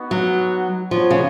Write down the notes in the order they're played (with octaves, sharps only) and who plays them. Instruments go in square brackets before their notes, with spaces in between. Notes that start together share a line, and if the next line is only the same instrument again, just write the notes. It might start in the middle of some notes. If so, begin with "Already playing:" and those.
Already playing: [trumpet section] B3 D#4 F#4
[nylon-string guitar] F#3
[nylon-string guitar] F3 [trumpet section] B3 D#4 F#4 C#5
[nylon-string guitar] C#3